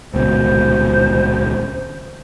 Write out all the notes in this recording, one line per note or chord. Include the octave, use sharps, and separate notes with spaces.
D#1 C#2 B2 C5